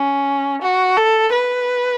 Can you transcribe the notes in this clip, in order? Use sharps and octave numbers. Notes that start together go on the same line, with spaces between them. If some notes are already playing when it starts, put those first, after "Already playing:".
Already playing: C#4
F#4
A4
B4